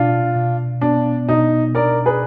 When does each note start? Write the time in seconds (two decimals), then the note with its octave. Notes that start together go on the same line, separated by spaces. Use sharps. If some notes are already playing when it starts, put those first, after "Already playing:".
Already playing: B2 D4 F4
0.35 B2
0.81 B3 D4
1.29 B2 D#4
1.75 D4 A#4 D5
2.05 G#4 B4